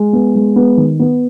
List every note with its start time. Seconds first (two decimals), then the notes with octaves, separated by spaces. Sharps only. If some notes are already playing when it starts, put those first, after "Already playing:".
Already playing: G#3
0.13 B3
0.35 G#3
0.56 B3
0.77 D#3
0.99 B3